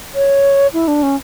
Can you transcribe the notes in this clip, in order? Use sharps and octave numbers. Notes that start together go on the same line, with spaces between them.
C#5
E4
D4
C#4